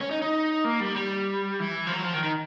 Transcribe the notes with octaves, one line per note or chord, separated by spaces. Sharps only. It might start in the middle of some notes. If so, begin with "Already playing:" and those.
C#4
D#4
D#4
A#3
G3
G3
E3
F3
F#3
F3
D#3
D#3